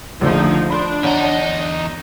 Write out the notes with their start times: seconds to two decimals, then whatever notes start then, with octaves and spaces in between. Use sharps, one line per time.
0.21 A#1 D3 F3 A3 D#4
0.70 D4 B5 C6
1.03 E2 D#4 C#5 F#5